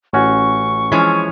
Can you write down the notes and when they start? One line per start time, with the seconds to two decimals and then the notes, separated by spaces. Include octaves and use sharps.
0.13 A1 C#4 F#4 C#6
0.92 E3 F3 G#3 C#4